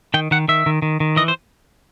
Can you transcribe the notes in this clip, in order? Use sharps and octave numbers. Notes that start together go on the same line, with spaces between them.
D#3 G5
D#3 F#5
D#3 E5
D#3
D#3
D#3
E3 D#5
C5